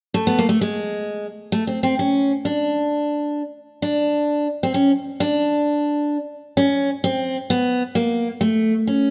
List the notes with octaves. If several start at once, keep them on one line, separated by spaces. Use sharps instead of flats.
A3
B3
A#3
A3
G#3
A3
C4
C4
C#4
D4
D4
C4
C#4
D4
C#4
C4
B3
A#3
A3
C#4